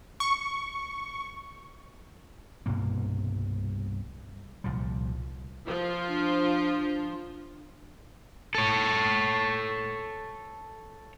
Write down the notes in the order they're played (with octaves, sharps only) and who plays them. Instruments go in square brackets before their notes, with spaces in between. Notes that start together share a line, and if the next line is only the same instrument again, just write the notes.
[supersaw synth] C#6
[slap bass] C2 G2 B2 A#3
C2 A#2 F3 G3
[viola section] F3 F4
[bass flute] D4
[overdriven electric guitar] A4 C#5